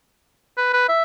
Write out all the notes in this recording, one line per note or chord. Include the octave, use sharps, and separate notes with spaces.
B4
B4
E5